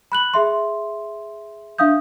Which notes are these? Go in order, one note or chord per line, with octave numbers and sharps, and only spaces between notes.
B5 F#6 F#7
G#4 E5 C6
D4 E5 F5 D#6 G6